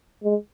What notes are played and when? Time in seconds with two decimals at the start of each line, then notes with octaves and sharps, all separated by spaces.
0.23 G#3